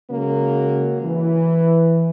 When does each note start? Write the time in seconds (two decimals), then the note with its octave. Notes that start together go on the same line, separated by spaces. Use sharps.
0.10 C#3 F#3 G#3 A#3
1.02 E3